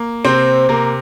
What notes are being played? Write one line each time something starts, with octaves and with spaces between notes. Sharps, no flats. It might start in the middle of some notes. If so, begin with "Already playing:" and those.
Already playing: A#3
C3 C4 C5
C3 A#3 A#4